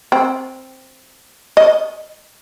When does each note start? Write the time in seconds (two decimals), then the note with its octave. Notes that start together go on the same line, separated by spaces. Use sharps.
0.12 C4
1.57 D#5